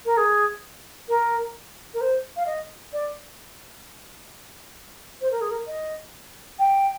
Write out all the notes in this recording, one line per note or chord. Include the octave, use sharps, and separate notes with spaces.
A#4
G#4
A#4
A#4
C5
F5
D#5
D5
C5
A#4
G#4
A#4
D#5
G5